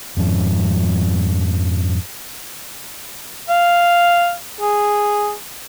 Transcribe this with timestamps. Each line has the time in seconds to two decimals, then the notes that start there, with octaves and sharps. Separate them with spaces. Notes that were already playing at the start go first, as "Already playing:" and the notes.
0.17 F2 G#2 F3
3.49 F5
4.61 G#4